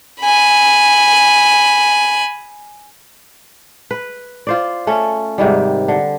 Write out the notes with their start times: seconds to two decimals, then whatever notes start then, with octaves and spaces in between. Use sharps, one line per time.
0.21 G#5 B5
3.91 B4
4.47 F4 C5 D5
4.87 A3 C#4 A4
5.38 G#2 C3 D#3 G3
5.88 D3